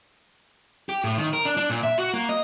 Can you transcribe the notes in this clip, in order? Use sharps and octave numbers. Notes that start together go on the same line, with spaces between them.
G4
A2
D#3
A#4
D4
D4
A#2
E5
F#4
A#3
D#5